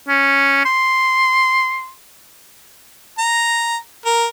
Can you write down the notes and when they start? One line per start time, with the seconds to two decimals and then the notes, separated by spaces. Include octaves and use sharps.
0.08 C#4
0.65 C6
3.18 A#5
4.06 A#4